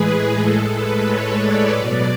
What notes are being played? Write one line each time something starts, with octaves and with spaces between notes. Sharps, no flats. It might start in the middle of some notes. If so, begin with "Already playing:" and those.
Already playing: A2 E3 G#3 G#4 B4
A2 G#3 A4
B4
C#5
D5
B2 F#3 D5